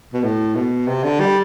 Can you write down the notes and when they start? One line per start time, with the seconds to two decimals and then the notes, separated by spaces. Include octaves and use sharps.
0.14 B2
0.23 A2
0.55 B2
0.88 C3
1.03 D3
1.20 G3